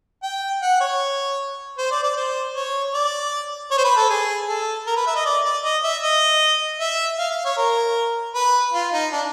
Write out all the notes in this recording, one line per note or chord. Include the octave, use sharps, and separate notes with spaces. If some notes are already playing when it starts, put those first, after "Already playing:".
G5
F#5
C#5
C5
D5
D5
C5
C#5
D5
C#5
C5
B4
A4
G#4
A4
A#4
B4
E5
D#5
D5
D5
D#5
E5
D#5
E5
F5
F5
C#5
A#4
B4
F4
D#4
D4